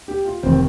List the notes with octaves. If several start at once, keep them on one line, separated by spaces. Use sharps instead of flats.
G4
F4
F1 D#3 C4